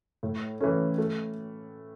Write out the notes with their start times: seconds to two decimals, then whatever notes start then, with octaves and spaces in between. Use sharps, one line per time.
0.23 A2
0.60 E3 A3 C#4
0.98 A3